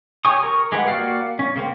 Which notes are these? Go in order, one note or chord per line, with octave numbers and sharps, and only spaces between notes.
G4 C#5 G#5 C#6 D#6
A#4 C#6
G#3 G4 G#4 B4 F#5
A#3 F#4 D5 F5 G5
C#4
C#3 A#3 C4